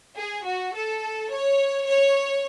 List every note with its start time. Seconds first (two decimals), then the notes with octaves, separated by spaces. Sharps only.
0.18 G#4
0.46 F#4
0.75 A4
1.31 C#5
1.88 C#5